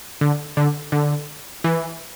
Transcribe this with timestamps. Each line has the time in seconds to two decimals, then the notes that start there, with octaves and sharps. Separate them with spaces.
0.21 D3
0.57 D3
0.92 D3
1.64 E3